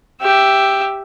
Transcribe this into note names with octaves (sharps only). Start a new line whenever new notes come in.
G4 E5